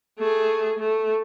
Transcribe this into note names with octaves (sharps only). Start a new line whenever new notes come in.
A3 G#4
A3